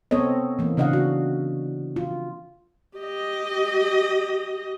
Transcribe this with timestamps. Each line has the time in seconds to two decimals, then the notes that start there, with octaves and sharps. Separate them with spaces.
0.11 B3 C4 A4 C#5 D#5
0.59 E3 A#3
0.77 C#3 D4 D#5 F5 F#5
0.93 F#4
1.96 F4
2.97 G4 D#5